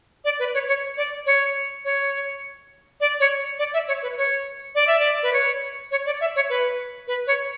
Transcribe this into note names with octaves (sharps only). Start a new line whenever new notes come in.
D5
B4
C#5
C#5
D5
C#5
C#5
D5
C#5
D5
E5
C#5
B4
C#5
D5
E5
D5
B4
C#5
C#5
D5
E5
C#5
B4
B4
C#5